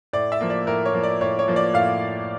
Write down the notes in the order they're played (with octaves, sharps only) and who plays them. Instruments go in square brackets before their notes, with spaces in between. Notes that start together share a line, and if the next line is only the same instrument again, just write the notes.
[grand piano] A2 D5
E5
F3 A#3
D5
A2 A#4
C#5
F3 A#3
D5
A2 C#5
C#5
F3 A#3
D5
A2 F5